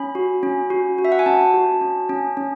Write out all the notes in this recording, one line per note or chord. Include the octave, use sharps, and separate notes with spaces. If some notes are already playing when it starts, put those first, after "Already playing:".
Already playing: C#4 B5
F#4
C#4
F#4
F#4
E5
F#5
G#5
C#4 A5
F#4
C#4
C#4
C#4